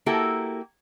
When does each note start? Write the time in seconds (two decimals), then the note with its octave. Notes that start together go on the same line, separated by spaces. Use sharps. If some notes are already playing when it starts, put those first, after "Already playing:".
0.06 A#3 E4 F#4 G4 A4